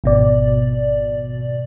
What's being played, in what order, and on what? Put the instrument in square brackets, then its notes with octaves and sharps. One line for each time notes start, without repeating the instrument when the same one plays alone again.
[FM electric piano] G#1 B2 D5